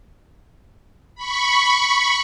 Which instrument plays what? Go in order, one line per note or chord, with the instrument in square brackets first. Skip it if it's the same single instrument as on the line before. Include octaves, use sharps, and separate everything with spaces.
[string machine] B5 C#6